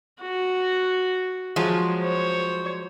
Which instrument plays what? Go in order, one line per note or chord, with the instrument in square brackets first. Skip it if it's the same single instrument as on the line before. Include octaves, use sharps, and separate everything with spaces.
[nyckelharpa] F#4
[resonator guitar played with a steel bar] F3 F#3 G#3
[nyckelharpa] C5 C#5